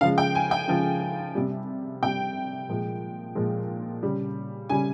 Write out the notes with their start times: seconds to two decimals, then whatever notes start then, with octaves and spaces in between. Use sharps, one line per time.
0.01 C#3 F3 G#3 F5
0.18 G5
0.35 G#5
0.51 G5
0.68 C#3 F3 G#3
1.35 C3 G3
2.03 C3 G3 G5
2.69 A#2 F3 G#3
3.35 A#2 F3 G#3
4.03 C#3 G3
4.70 C#3 G3 G#5